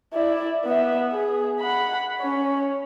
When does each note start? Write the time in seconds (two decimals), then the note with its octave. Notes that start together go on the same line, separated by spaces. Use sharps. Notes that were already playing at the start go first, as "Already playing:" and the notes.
0.13 E4 D5
0.65 B3 E5
1.12 G#4
1.61 F#5 B5
2.18 C#4 C#5